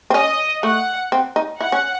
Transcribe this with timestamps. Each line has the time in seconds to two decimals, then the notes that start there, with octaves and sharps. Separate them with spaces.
0.10 C4
0.14 C#4 D#5
0.63 A3 F#5
1.12 C4
1.36 D#4
1.60 E4 F#5
1.72 C#4